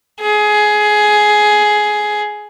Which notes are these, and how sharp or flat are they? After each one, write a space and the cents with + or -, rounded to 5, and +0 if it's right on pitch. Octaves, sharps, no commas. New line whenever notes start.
G#4 +15